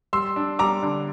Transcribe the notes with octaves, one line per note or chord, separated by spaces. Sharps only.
G3 C6 E6
D4
G3 A#5 D6
D3